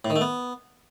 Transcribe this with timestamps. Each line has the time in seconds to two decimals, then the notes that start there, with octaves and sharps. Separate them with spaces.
0.05 A2
0.10 D#3
0.16 A3
0.21 B3